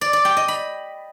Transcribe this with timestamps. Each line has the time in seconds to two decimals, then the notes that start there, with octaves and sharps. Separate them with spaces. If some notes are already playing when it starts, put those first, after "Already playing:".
0.01 D5
0.13 D5
0.25 G5
0.37 D#5
0.48 B5